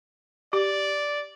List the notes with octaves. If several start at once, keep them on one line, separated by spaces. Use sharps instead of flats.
G4 D5